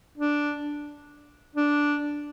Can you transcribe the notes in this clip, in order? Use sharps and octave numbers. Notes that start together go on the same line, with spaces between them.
D4
D4